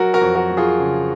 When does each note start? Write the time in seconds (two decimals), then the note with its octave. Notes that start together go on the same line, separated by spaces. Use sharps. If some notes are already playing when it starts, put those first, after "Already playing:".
Already playing: F#3 F#4 A#4
0.14 F#4 A#4
0.21 F2
0.35 F#4 A#4
0.50 F#3
0.57 F4 G#4
0.79 C#3